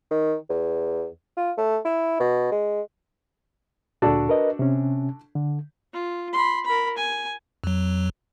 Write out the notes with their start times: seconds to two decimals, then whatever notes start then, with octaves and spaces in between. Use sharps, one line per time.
0.11 D#3
0.50 E2
1.37 F4
1.58 A3
1.85 E4
2.20 B2
2.51 G#3
4.02 D2 A#2 D4 F#4 A4
4.29 A#4 B4 D#5
4.59 C3 C#4
5.35 D3
5.93 F4
6.33 B5 C6
6.65 A#4 B5
6.97 G#5
7.64 F2 F#3